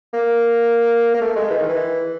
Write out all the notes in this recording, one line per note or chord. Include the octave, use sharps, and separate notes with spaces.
A#3
A#3
A3
G#3
E3
D#3
E3